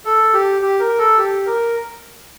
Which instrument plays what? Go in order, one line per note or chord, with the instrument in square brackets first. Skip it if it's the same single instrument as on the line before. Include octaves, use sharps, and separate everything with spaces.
[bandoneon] A4
G4
G4
A#4
A4
G4
A#4